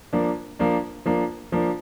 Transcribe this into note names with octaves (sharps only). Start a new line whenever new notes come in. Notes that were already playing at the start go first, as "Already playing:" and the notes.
F3 A#3 D4
F3 A#3 D4
F3 A#3 D4
F3 A#3 D4